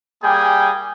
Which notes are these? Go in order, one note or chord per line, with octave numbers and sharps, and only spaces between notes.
G3 A#3 G#4 G5 G#5